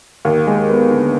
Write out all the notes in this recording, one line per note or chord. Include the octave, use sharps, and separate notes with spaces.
D#2
G#3
B3
D3